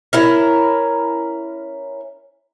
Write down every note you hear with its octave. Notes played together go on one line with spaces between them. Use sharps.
C#4 E4 A#4